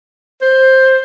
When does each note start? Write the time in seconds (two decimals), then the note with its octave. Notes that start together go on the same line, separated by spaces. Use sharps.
0.41 C5